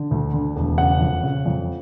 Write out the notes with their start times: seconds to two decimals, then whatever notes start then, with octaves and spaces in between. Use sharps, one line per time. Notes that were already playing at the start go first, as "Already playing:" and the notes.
Already playing: D3
0.11 D2
0.33 D3
0.56 E1
0.78 C#3 F#5
1.00 F2
1.23 C#3
1.46 F2